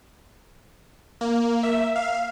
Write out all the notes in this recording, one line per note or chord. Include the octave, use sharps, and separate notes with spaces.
A#3
E5
F5